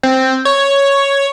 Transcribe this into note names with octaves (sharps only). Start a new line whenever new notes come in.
C4
C#5